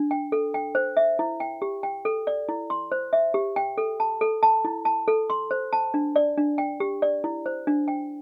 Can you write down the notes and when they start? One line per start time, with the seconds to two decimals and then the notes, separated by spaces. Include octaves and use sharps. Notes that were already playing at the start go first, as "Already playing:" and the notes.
Already playing: D4
0.11 G5
0.32 A4
0.54 G5
0.75 C5
0.97 E5
1.19 E4
1.40 G5
1.62 G4
1.83 G5
2.05 A4
2.27 D5
2.49 E4
2.70 C6
2.92 C5
3.13 E5
3.34 G4
3.56 G5
3.78 A4
4.00 A5
4.21 A4
4.43 A5
4.65 E4
4.85 A5
5.08 A4
5.30 C6
5.51 C5
5.73 A5
5.94 D4
6.16 D5
6.38 D4
6.58 G5
6.80 G4
7.02 D5
7.24 E4
7.46 C5
7.67 D4
7.88 G5